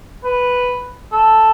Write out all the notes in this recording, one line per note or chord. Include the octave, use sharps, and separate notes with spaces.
B4
A4